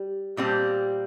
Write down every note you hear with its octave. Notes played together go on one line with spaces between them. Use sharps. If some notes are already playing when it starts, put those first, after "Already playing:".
Already playing: G3 G4
A#2 G3 C4 G4